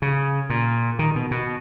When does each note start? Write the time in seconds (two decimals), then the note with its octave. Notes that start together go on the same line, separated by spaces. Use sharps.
0.02 C#3
0.50 A#2
0.99 D#3
1.15 B2
1.31 B2